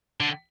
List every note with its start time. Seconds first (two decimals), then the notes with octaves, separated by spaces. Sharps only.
0.20 D3